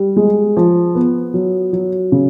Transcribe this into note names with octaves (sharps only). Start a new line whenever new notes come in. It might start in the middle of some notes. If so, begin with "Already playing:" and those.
Already playing: G3
G#3
F3
B3
F#3
F#3
C#3